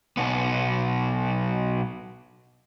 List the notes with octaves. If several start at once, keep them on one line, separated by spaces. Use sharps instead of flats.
B1 B3